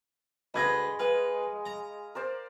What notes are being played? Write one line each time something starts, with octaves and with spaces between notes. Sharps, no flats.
D2 G#3 B4 C5 B5 G#6 A#6
B4 F5 G#5
A#5
A#4 C5 D5